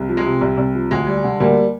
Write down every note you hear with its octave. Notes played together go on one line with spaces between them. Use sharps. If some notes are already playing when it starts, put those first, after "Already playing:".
Already playing: C2
F3
G#3
C3
C2
C2
F3
D2 G#3
G3
D3
D2 G3 A#3